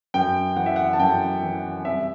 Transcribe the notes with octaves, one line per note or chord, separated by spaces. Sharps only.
F#2 G5
E3 F#5
E5
F#5
A5
F#2 G5
E3
C2 E5